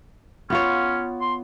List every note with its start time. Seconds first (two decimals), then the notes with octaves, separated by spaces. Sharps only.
0.50 B3 C#4 F4 C#5
1.21 C6